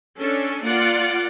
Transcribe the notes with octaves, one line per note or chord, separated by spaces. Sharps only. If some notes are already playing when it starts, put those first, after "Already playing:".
C#4 D4 A4
A#3 F4 D5 F#5